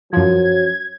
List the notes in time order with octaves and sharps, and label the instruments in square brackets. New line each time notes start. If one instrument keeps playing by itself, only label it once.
[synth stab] F#2 F3 [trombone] F#3 [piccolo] G#6